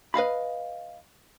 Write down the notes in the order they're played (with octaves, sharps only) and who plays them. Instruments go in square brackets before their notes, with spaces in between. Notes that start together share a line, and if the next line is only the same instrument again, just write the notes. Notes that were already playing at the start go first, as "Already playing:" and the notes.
[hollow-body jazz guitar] B4 D#5 F5 B5